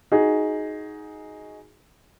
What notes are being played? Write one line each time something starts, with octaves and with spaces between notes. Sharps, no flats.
D#4 F#4 G#4